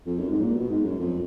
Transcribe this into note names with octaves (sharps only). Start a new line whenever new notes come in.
F2
F#2
G#2
A#2
B2
G#2
F#2
F2